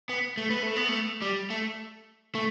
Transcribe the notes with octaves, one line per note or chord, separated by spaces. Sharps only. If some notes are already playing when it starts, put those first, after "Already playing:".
B3
A3
B3
A3
B3
A3
G3
A3
A3